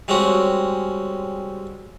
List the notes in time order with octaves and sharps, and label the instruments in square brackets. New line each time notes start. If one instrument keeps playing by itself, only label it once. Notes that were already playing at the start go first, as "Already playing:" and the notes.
[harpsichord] G3 G#3 C4 C#4 F#4